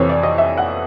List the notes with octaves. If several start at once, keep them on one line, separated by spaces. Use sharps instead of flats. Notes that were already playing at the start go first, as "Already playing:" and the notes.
Already playing: F2 C3 E3 C5 C#5
D5
D#5
E5
F#5